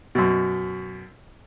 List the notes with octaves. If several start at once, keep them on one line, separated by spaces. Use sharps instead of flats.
F#2 B2